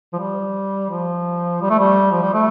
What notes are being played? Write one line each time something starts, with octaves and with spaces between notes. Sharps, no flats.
F3
G3
F3
G3
A3
G3
F3
G3
A3